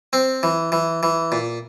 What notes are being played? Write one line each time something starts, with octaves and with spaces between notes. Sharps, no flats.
C4
E3
E3
E3
A#2